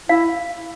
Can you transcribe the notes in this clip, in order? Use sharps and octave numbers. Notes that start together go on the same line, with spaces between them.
E4 F5